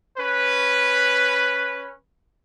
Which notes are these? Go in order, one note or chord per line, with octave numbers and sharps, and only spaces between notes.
C#4 B4